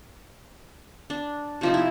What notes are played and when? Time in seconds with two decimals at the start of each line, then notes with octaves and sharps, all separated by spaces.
1.10 D4
1.61 C3 F3 D#4
1.74 E4